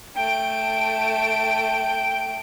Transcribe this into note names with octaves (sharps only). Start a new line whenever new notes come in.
A3 G5 D7